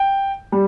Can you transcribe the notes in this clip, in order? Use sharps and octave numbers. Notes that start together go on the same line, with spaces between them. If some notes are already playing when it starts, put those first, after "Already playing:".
Already playing: G5
G3